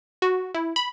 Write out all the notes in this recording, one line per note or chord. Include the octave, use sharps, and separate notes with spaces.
F#4
E4
B5